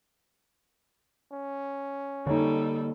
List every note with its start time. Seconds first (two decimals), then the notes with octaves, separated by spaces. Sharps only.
1.32 C#4
2.27 D3 G3 A#3 D#4 A4 C#5